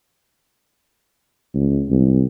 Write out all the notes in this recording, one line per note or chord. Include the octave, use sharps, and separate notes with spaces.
C#2
C2